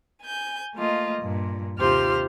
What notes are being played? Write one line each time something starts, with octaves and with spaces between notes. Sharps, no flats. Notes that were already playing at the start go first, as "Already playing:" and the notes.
G#5 G6
A3 A#3 F4 D#5
G2 A#2
D#2 C3 F4 G4 C5 F6